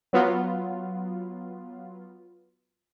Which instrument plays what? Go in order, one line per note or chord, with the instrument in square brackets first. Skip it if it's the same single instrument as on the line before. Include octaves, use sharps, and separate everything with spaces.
[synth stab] F#3 B3 F4